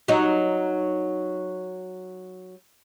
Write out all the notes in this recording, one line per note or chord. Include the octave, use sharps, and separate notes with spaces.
F#3 D#4